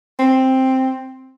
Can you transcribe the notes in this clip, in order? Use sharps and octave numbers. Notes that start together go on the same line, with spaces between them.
C4